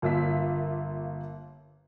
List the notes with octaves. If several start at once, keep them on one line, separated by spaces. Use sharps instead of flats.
G1 A#3 F4 E5 B6